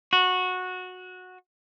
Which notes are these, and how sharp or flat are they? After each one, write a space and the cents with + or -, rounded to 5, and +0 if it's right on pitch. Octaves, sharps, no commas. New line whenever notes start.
F#4 -15